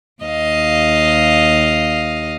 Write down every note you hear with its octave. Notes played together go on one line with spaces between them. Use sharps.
D#2 D#5 F5